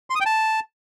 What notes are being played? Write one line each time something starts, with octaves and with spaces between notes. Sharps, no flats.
C6
D#6
G5
A5